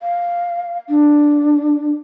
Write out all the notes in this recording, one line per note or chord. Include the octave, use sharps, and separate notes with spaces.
F5
D4